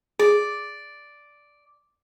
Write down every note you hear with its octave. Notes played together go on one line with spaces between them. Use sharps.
G#4 D5